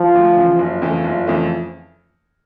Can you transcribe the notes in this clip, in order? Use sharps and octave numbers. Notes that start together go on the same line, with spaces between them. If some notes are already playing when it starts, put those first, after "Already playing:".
Already playing: F3
D2
C#3 E3
F#1 F3
F2 C#3 E3 A3
F#1
F2 C#3 E3 A3